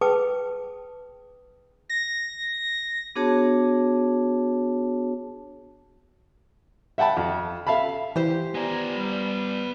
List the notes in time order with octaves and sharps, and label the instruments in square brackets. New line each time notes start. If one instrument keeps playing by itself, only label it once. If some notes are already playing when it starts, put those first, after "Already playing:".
[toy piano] G#4 B4 G5 A5 D6 D#6
[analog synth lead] A#6
[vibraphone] B3 D4 F#4 G#4 C#5 A5
[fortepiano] E5 F#5 G5 A5 B5
F2
A4 E5 F5 A5 B5
[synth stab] E3 [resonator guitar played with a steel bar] G4 C5
[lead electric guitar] B3 D5 [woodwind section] G#5 A#5
[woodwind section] G3